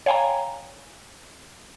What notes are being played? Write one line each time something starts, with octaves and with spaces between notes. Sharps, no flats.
C#5 F5 G5 G#5 A#5